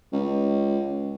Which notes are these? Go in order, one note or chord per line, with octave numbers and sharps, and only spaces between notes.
C#2